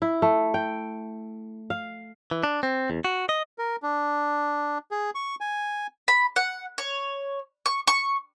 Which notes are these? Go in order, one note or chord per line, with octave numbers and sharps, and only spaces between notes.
E4
A3
G5
F5
E3
D4
C4
E2
F#4
D#5
A#4
D4
G#4
C#6
G#5
B5
F#5
C#5
C#6
C#6